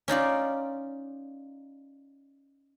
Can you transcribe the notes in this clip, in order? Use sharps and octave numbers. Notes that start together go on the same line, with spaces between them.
C#4 D#4 F4 D5